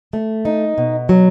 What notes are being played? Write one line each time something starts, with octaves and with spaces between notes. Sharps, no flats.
A3
D#4
B2
F#3